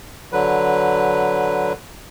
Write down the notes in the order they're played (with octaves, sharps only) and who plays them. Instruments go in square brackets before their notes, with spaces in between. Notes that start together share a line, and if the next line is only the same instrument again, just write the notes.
[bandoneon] D3 F#3 B4